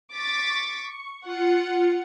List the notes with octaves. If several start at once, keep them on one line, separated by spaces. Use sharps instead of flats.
C#6 D6 A6 B6
F4 F#5 C#7